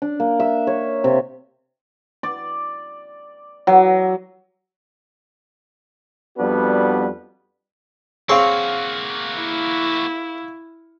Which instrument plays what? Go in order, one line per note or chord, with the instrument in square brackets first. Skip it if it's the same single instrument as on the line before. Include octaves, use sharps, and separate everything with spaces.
[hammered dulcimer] D4
A#3
E5
C#5
C3
D5
F#3
[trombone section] F2 G3 B3 D4 F#4 B4
[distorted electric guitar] A#3 F#4 [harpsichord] C4 G#4 C#5 [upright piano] F5 C#6
[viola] E4